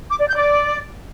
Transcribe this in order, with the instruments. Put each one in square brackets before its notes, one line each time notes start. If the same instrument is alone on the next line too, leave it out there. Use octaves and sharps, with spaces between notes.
[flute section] D6
D5
G6
D5